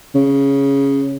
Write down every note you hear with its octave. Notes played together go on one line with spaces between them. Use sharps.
C#3